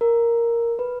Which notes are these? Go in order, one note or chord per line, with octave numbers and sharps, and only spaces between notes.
A#4
B4